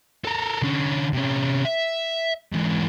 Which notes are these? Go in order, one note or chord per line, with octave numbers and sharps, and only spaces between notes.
A4 A#4
D3 C#4
C3 C#4
E5
G#2 E3